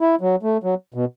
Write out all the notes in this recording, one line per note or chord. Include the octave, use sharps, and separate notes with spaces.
E4
F#3
A3
F#3
B2